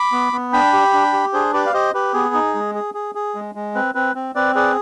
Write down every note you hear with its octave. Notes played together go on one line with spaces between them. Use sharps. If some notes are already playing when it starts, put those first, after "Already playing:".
Already playing: B5 D6
B3
B3
D4 G5 B5
G4
D4
G4
D4 G#4 C5
G4 B4 D5
F5
G4 C5 D#5
G4 B4
B3 G#4
D#4
G#3
G#4
G#4
G#4
G#3
G#3
C4 B4
C4 B4
C4
C4 B4 D5
G#4 B4 D5